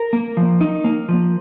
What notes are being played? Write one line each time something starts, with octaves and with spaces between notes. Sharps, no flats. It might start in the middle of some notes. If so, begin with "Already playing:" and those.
Already playing: A#4
A#3
F3
D#4
A#3
F3